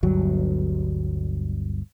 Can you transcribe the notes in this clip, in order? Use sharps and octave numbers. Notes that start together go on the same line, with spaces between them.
G1 D2 G2 F#3